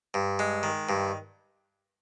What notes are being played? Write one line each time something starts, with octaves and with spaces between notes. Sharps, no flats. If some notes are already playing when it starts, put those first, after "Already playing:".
G2
G#3
D#3
G2